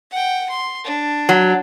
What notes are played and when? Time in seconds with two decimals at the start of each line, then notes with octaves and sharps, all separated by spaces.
0.11 F#5 G5
0.50 C6
0.85 D4
1.29 F#3